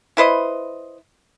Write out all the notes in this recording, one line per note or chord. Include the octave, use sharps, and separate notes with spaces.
E4 B4 C5 D#5